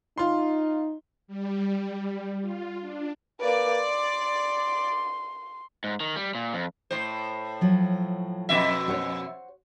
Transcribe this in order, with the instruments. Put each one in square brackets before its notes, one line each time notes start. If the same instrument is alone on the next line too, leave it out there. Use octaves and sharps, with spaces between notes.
[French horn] D#4 [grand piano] F4 C6
[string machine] G3
F4
D4
[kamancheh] A#3 B4 [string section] D5
[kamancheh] C6
[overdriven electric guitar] G#2
D#3
G3
A#2
F2
[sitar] A2 C5
[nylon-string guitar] F3 F#3
[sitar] F2 B2 E5
[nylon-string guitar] F#4 C5 C#5